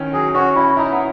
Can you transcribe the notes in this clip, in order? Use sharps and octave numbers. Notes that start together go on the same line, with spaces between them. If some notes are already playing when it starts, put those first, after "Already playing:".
Already playing: D#3 C#4 E4
F#3 G#4
C#4 F#4
C#4 E4
D#4 E4
B3